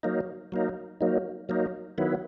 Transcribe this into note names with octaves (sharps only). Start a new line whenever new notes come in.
F#3 A#3 D#4
F#3 A#3 D#4
F#3 A#3 D#4
F#3 A#3 D#4
D#3 F#3 B3 E4